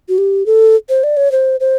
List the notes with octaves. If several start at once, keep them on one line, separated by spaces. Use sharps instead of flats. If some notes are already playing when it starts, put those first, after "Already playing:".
F#4
G4
A4
C5
D5
C#5
C5
C5